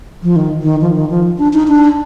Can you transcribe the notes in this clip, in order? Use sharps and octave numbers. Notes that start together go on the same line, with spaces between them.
F3
D#3
D#3
F3
D#3
F3
D4
D#4
D4